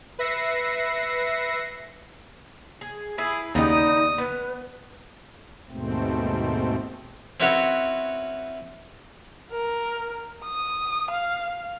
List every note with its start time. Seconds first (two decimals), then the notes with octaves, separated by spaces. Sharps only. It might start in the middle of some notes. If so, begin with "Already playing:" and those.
0.19 B4 E5 A#6 C7 C#7
2.81 G#4
3.18 E4 G#4 B4
3.55 D#2 C#3 B3 D#4 G4 D5 A#5 D#6
4.18 B3 B4
5.69 D#2 G#2 B2 A3 C4
7.40 C4 C#4 E4 F#4 B4 C#5
9.51 A#4
10.44 D#6
11.10 F5